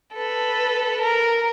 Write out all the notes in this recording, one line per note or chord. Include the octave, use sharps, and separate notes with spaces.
A4 B4
A#4